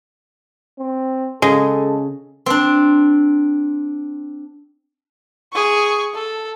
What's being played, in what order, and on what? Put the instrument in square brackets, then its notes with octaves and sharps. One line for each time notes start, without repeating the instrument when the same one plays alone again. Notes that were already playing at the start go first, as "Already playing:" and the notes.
[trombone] C4
[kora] C#3 [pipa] G#3 [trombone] A4
[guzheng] C4 D4
[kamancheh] G#4 C#6
A4